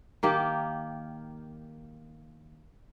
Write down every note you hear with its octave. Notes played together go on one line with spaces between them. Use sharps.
D#3 A#3 G4